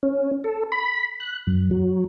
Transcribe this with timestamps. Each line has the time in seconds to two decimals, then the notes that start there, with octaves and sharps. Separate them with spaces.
0.03 C#4
0.44 A4
0.72 B5
1.20 F#6
1.47 F#2
1.71 F#3